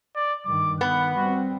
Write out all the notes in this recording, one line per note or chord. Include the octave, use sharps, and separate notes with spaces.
D5
G2 D#3 D6
D#3 B3 F#6
G3 C4 F#4